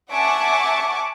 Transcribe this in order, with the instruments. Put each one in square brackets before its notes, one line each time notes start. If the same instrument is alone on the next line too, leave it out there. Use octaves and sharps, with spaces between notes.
[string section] E5 F#5 G#5 A5 C#6 D6